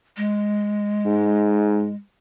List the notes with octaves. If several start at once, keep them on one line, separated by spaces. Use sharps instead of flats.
G#3
G#2